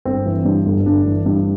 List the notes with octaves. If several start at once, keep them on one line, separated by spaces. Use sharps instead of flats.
G1 C4
E3
G2
G1
G1 D4
E3
G2